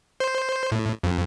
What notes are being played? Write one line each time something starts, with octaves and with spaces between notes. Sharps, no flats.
C5
A2
F2